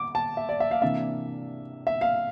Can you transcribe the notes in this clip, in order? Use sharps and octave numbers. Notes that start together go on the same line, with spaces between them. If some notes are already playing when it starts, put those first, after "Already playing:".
Already playing: D6
A5
E5
D5
E5
F5
C3 E3 A#3 D4 E5
E5
F5